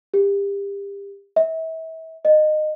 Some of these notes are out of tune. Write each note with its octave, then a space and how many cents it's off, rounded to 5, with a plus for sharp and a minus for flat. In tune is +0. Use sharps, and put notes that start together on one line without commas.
G4 +30
E5 -35
D#5 -20